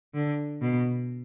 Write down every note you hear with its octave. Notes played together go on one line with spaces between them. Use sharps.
D3
B2